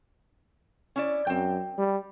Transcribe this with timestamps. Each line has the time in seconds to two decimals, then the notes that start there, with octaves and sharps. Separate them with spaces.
0.96 C#4 E4 D5
1.27 F#2 C4 G5
1.78 G3